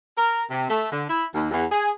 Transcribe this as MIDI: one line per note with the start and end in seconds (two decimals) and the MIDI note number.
0.17 0.43 70
0.51 0.70 48
0.70 0.91 57
0.91 1.04 50
1.08 1.25 64
1.34 1.51 39
1.51 1.64 40
1.71 1.89 68